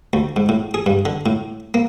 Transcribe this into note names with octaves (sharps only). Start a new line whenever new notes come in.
D2
G#2
A2
G#4
G2
D3
A2
A#3